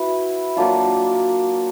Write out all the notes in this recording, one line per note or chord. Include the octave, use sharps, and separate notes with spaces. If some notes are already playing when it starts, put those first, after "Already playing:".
Already playing: E4 F#4 B4
F#3 A#3 D4 F4